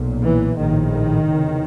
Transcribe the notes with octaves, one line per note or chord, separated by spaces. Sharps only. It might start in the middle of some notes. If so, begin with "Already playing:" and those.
Already playing: B1 A#2
E3
A#1 A2 D#3
F1 E2 C#3